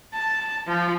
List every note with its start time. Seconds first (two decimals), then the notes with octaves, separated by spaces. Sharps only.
0.13 A5
0.67 F3